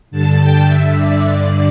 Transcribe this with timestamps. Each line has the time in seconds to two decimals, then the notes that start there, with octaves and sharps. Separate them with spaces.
0.11 G2 D3 A5
0.39 G5
0.67 G2 D3 E5
0.96 D5
1.24 G2 D3